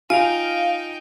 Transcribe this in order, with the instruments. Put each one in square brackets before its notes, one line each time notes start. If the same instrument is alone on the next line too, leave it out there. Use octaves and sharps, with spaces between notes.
[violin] D#4 G5 [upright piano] F4 D7 F7 [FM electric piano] F5 [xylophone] G#5